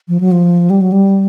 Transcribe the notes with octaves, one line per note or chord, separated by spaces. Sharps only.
F3
F#3
F3
G3
F#3
G3